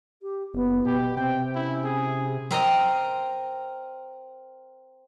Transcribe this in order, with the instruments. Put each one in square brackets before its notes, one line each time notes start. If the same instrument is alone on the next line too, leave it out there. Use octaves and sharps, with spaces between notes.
[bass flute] G4
[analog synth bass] F#1 [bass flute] B3
[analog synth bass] B2 [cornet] G4
[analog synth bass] C3 [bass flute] C4 [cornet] G5
[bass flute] C#4 [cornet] E4
[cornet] G#4
[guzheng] C4 A#4 D#5 A#5